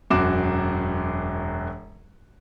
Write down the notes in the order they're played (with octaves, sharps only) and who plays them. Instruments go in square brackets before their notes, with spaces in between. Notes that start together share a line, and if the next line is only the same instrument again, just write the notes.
[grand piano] E1 F#2 F#4 D6 E7